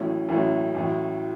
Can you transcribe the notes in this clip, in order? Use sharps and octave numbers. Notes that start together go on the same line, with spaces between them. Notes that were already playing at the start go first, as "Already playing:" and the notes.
Already playing: A1 A2 F#3 A3 C#4
A1 A2 F#3 A3 C#4
A1 A2 F#3